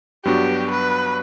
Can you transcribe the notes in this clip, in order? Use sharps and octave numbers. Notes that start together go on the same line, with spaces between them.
G2 F#3 B3 D4 F#4 G4
B4